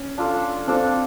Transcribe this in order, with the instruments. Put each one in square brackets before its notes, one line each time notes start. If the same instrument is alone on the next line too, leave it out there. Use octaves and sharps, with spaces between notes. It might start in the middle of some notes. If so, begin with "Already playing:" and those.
Already playing: [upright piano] C#4
[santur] D4 F4 A4
[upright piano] C4 [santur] D4 F4 A4